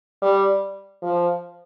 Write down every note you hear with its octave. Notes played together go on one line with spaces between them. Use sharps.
G3
F3